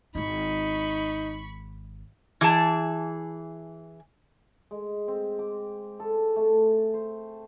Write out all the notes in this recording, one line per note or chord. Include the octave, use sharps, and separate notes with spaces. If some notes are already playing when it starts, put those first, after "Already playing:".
G#1 D#4 E4 B5 C#6
E3 G#4 A5
G#3
C4
D6
A4
A3
C5